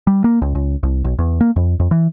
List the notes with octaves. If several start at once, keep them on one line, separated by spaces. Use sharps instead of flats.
G3
A#3
C#2
C#2
C2
B1
E2
A#3
F2
F2
E3